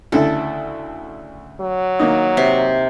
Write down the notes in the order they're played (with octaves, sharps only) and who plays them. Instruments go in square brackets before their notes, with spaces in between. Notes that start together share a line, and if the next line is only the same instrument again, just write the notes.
[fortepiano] D2 C#3 E4 [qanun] A4
[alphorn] F#3
[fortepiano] D#3 A#3 D#4
[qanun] C3